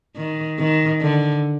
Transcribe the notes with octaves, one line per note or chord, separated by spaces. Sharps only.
D#3
D#3
D3